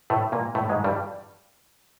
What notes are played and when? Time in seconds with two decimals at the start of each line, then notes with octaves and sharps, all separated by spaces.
0.10 A2 A3
0.32 A#2 A#3
0.55 A2 A3
0.70 G#2 G#3
0.84 G2 G3